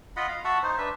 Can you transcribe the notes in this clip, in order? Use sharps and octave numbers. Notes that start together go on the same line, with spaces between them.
F4 D#5 F#5 B5
F5
F#4 E5 F#5 A5
D#4 C5
D4 B4 E5